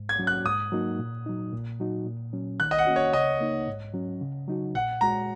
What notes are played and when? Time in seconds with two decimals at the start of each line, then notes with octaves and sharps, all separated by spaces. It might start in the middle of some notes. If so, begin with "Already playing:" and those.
Already playing: G#2
0.09 G#6
0.19 F#3 C#4 F#4
0.27 F#6
0.45 G#2 D#6
0.72 F#3 A#3 D#4 F#4
0.99 A#2
1.26 F#3 D#4
1.53 A#2
1.80 F#3 D#4 F#4
2.06 A#2
2.33 F#3 C#4
2.60 D#3 F#6
2.71 D#5
2.78 F#5
2.87 A#3 C#4 F#4
2.96 C#5
3.13 C#3 D#5
3.41 A#3 D#4
3.67 G#2
3.93 F#3 C#4
4.21 C#3
4.48 F#3 D#4 F#4
4.74 A#2 F#5
5.01 G#3 F#4 A#5